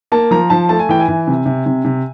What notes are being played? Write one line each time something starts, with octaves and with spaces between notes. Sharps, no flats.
A#3 A5
F3 A#5
F3 A5
A3 A5
G#5
E3 G5
G#5
E3
C3
C3
C3
C3